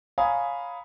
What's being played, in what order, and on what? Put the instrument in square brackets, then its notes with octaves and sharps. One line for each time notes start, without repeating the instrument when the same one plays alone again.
[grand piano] C#5 F5 G#5 A#5 B5 D#6